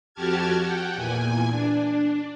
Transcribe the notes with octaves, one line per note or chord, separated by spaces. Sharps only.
F2 F#4 G4 A5 F6 G#6
F#5 G5
E2 A#2 G#5
D4